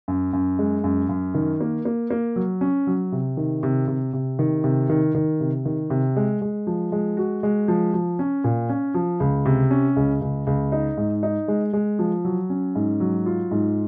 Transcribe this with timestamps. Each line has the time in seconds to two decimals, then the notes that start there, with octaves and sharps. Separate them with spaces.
0.08 F#2
0.33 F#2
0.59 G#3
0.84 F#2
1.09 F#2
1.34 D#3
1.61 A#3
1.85 A#3
2.11 A#3
2.36 F#3
2.61 C#4
2.87 F#3
3.12 C3
3.37 D#3
3.63 C3
3.88 C3
4.13 C3
4.39 D#3
4.64 C3
4.90 D#3
5.15 D#3
5.40 C3
5.65 D#3
5.90 C3
6.16 G#3
6.41 G#3
6.67 F3
6.92 G#3
7.17 F#4
7.43 G#3
7.68 F3
7.94 F3
8.19 C#4
8.44 A#2
8.69 C#4
8.94 F3
9.20 C#2
9.46 C3
9.71 C#4
9.96 C#2
10.21 C#2
10.47 C#2
10.72 D#4
10.97 G#2
11.23 D#4
11.48 G#3
11.73 G#3
11.99 F3
12.25 F#3
12.50 C#4
12.75 G#2
13.00 F#3
13.26 F4
13.51 G#2